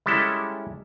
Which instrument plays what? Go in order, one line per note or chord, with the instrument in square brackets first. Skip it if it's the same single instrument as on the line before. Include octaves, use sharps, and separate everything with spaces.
[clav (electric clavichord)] G3 G#3 C#4 E4 A4